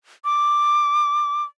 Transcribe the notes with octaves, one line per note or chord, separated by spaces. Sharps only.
D6